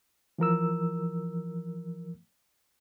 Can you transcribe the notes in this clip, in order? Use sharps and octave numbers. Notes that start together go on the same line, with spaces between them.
E3 F3 A#4 E6